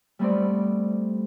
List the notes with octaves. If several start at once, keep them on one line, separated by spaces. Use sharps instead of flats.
G3 A3 B3 C4 D5